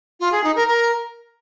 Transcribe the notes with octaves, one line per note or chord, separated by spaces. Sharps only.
F4
G#4
D#4
A#4
A#4